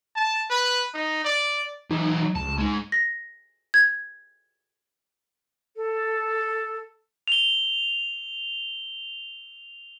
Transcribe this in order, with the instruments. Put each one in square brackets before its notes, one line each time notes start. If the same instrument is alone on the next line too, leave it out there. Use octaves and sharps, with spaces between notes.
[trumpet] A5
B4
D#4
D5
[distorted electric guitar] E3 F#3 [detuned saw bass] D#4
[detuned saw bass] C#2 [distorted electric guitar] A5
[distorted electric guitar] G#3 D#4
[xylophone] A#6
G#6
[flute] A4
[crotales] F7 G7